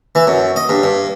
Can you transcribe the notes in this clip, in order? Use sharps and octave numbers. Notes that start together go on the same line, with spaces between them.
E3
F#2
D#5
G2
G2